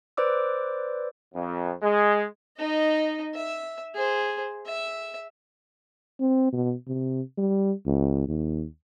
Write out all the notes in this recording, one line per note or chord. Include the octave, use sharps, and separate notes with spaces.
B4 C5 D5 D6 E6
F2
G#3
D#4 D#5
E5
G#4 C5
E5
C4
B2
C3
G3
C#2
D#2